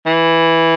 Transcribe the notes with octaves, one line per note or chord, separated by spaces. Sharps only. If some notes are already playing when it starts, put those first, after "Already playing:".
E3